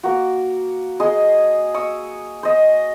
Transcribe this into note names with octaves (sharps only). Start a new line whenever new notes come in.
A#3 F#4
G#4 D#5 C6
C#6 D#6 E6
C5 D#5